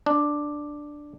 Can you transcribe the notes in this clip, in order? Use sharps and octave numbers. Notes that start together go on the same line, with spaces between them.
D4